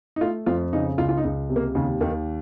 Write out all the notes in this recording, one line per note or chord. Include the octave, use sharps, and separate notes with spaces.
D#4
A3 F4
F2 F4
C#3 D#4
C#2 F4
F4
D#4
C#2
C3
A#3
D#2 C#3
D#2 D#3